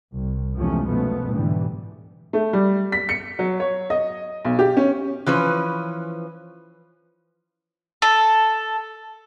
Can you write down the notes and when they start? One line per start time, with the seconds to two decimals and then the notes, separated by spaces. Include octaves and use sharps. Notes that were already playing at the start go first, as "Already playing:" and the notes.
0.12 C2
0.55 E2 C3 F3 G#3 A3 C#4
0.86 F#2 B2 F3 A3 B3
1.31 D2 G#2 B2 D3 E3 G3
2.33 A3
2.53 G3
2.92 B6
3.09 C#7
3.39 F#3
3.60 C#5
3.90 D#5
4.45 B1
4.59 G4
4.77 C#4
5.26 E3 F3 C#4 B4
8.02 A4